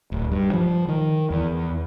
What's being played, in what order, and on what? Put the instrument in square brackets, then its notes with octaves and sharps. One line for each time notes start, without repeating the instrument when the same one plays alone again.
[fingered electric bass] D1
G2
F3
D#3
E2